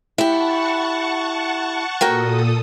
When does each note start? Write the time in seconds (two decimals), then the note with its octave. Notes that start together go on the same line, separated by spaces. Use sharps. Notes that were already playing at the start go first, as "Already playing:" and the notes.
0.18 E4 G4 F#5 A5 C#6
2.01 A#2 F#4 A4 A#4 G5 D#6